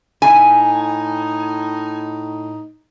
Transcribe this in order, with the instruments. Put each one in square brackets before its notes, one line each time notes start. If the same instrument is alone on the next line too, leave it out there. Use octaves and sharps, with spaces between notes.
[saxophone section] A2 D#4 [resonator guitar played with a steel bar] G#5